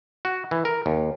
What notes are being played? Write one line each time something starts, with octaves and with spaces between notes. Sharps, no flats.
F#4
E3
A#4
D#2